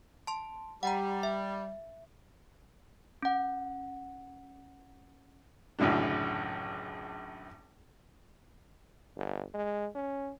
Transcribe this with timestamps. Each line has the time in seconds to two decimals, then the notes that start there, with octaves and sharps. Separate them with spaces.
0.27 A5 C6
0.83 G3 F#5 G5 A#5
1.23 E5
3.23 C#4 F#5
5.79 G#1 C#2 F#2 A2 D3 D4
9.16 G1
9.54 G#3
9.95 C#4